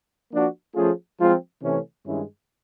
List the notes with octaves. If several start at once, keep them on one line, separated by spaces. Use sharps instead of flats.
F3 A#3 D4 F#4
F3 A3 C#4 F4 G#4
F3 G#3 C4 F4
C3 E3 A3 C#4
G2 D#3 G#3 C#4 E4